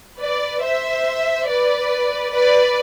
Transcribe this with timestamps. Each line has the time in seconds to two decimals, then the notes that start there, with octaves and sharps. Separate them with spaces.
0.19 B4 D5
0.62 C5 E5
1.47 B4 D5
2.32 B4 D5